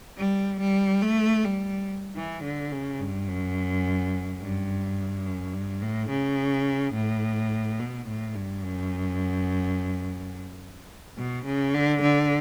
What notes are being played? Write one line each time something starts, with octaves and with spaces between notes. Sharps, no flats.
G3
G3
A3
G3
E3
D3
C#3
G2
F#2
G2
F#2
G2
A2
C#3
A2
B2
A2
G2
F#2
B2
C#3
D3
D3